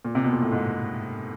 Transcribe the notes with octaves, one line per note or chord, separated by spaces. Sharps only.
A#2
C3
B2
A#2
A2
G#2